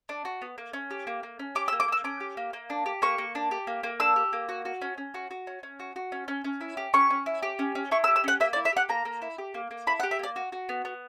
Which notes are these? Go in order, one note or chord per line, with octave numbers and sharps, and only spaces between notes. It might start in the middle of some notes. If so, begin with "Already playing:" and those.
D4
F#4
B3
A#3
C#4
G4
A#3
A#3
C#4
G4 D6
E6
A#3
D6
A#3 E6
C#4 D6
G4
A#3
A#3
D4
G4
A#3 C#6
A#3
D4
G4
A#3
A#3
D4 E6
G4
A#3
F#4
F#4
C#4
C#4
F#4
F#4
C#4
C#4
F#4
F#4
C#4
C#4
C#4
E4
G4
C#4 C#6
C#4
E4
G4
C#4
C#4
E4 C#6
E6
G4
E6
C#4 F#5
A#3 E5
D5
E4
E5
G4 F#5
A#3 A#5
A#3
E4
G4
A#3
A#3
E4 B5
F#5
G4
E5
A#3 D5
F#4
F#4
B3
B3